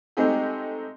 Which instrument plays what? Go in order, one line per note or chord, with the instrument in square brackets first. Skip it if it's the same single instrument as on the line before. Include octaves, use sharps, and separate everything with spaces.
[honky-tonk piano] G#3 A3 C4 D#4 G4 G#4